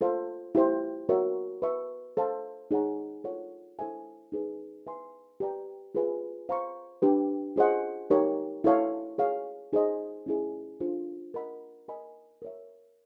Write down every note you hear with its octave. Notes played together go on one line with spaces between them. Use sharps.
F4 A4 C5 F5
E4 G4 C5
F#4 A#4 C#5 E5
B4 E5 A5 C#6
A4 C5 F5 A5
D#4 G#4 C#5 F#5 A#5
F4 A4 C#5 F#5
E4 A4 C5 E5 G#5
D#4 G#4 B4
B4 E5 G#5 C6
G4 B4 D5 G5 A#5
F4 G#4 B4 E5 G#5
C5 F5 A#5 C#6
D4 G4 B4
F4 G#4 C5 D#5 F#5
D#4 G4 A#4 C#5
E4 A4 C#5 F5 A5
G#4 C#5 F5
D#4 G#4 C5 D#5
C#4 E4 G#4
D4 F4 A4 C5
A#4 D#5 F#5 B5
A#4 D#5 G#5 B5
A#4 C#5 E5